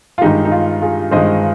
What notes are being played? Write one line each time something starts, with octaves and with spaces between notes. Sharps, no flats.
F4
G2 D#3 G#3 D#4 G4
D#4
F4
F4 G#4
G2 D#3 G#3 C5 D#5